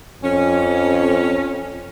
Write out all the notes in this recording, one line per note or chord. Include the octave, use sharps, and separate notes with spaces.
F2 C#4